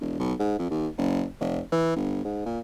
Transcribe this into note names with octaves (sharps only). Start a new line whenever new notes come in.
E1
B1
G#2
F2
D#2
F#1
F1
E3
G1
G#2
A#2